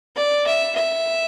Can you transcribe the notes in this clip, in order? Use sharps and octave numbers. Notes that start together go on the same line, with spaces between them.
D5
E5
E5